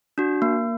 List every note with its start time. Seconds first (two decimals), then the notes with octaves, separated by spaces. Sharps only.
0.18 D4 F#4
0.42 A#3